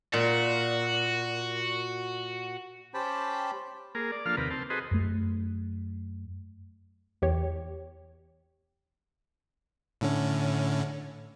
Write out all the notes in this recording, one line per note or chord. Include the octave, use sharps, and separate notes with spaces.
A#2 F#4
C#4 G4 C5 G5 A5 B5
A#3 G#4 A#4
D5
F3 A#3 D4 A4 F5 F6
D#2 C3 A#4 B4
C4 A5
F#4 G#4 A4 B4 C5 D#5
F#2 A3
E2 G4 C#5
A2 D3 C#4